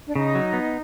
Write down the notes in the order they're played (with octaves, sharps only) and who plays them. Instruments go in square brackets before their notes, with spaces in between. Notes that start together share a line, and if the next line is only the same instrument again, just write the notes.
[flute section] D4
[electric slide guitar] C#3 [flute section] D#4
[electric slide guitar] F#3
B3